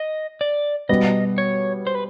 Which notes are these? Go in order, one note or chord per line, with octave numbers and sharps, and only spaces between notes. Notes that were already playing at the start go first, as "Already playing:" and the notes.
Already playing: D#5
D5
B2 G3 B3 D#5
C#5
C5
B4